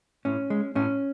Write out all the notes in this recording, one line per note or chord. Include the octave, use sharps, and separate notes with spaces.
A2 C#4
G#3
A2 C#4